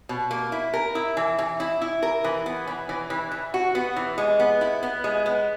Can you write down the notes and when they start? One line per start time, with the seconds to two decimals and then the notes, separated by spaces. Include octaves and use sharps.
0.09 B2
0.31 A#3
0.52 E4
0.74 A#4
0.95 E4
1.17 E3
1.39 E3
1.60 E4
1.82 E4
2.03 A#4
2.24 E3
2.46 B3
2.67 E3
2.89 E3
3.10 E3
3.32 E3
3.54 F#4
3.75 B3
3.96 E3
4.18 G#3
4.40 B3
4.61 E4
4.83 B3
5.04 G#3
5.26 B3